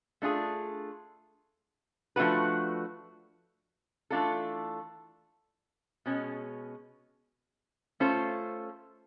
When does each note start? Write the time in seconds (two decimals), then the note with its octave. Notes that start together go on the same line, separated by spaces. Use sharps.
0.22 A3 D4 F4 G#4
2.16 F3 A3 D4 F#4 B4
4.10 E3 A3 D4 F4 A4
6.06 B2 G#3 C#4
8.00 A3 C#4 F4 A4 C5